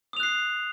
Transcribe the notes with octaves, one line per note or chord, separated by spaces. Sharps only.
D#6 F#6 C7 F7